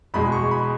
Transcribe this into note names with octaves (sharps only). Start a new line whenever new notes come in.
E2 B2 G#3 B5
C#6
B5